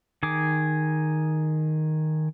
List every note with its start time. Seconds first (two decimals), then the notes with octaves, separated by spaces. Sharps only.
0.23 D#3 G#4 D6